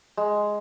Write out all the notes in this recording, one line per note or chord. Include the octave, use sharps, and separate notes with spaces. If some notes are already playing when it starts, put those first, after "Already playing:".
G#3